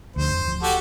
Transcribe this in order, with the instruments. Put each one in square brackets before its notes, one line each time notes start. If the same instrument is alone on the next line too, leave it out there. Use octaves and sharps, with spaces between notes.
[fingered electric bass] D2 F3 D4 [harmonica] C5
[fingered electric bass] F2
D1 F3
[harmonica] F#4 G4 A4